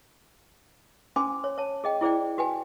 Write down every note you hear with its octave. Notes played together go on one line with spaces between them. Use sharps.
C#4 C5 G#5 C6 D6
C#5
C#5 A5
G#4 D#5 G5
E4 G#4 C5 D5 G5
F#4 B4 G5 G#5